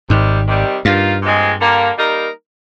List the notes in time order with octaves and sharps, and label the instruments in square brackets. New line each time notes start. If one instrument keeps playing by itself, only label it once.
[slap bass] G#1 G#2 [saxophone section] C3 D#3 G3
[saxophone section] C3 D#3 G3
[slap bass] G2 [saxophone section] D#3 A#3 F4
[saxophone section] A#2 F3 G#3 C4
D3 G3 A#3
G3 A#3 D#4 A#4